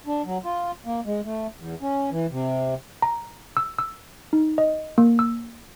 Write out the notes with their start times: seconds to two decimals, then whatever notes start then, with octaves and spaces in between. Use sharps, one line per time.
0.07 D4
0.26 F#3
0.44 F4
0.86 A#3
1.06 G#3
1.25 A3
1.57 E2
1.82 C#4
2.11 E3
2.31 C3
3.02 A#5
3.57 E6
3.79 E6
4.33 D#4
4.58 D#5
4.98 A#3
5.19 E6